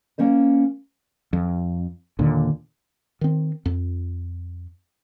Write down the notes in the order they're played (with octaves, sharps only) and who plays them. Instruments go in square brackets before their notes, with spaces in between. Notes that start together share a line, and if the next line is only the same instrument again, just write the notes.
[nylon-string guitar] A#3 C#4 C5 D#5
[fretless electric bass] F2
D#2 A#2 D3
D#3 C4
F2